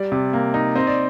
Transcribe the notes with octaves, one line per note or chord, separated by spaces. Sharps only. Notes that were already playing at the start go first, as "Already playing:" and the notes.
Already playing: G3 D5
C3
A#3
D#4
C4 D#5
D5